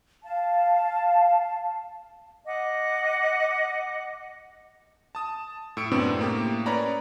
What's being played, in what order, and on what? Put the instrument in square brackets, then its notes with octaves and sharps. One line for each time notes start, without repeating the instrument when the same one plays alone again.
[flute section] F5 A5
D#5 F#5 D6
[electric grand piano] A5 D#6
A2 E6 C#7 D7
F#2 A2 C3 B3 C4 D4
A2 A#3 G4
C#4 B4 C#5 D5 A#5 B5